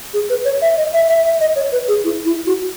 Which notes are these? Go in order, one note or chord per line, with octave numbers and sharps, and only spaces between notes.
G#4
B4
C#5
E5
D#5
E5
E5
E5
D#5
C#5
B4
G#4
E4
E4
F#4